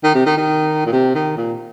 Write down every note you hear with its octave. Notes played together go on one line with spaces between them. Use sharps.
D#3
C3
D#3
D#3
A#2
C3
D#3
A#2